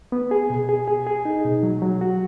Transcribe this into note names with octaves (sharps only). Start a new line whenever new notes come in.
B3
G#4
B2
G#4
G#4
G#4
D#4
B2
F#3
F#3
F#4